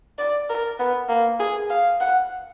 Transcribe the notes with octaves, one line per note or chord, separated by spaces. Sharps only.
D5
A#4
B3
A#3
G#4
F5
F#5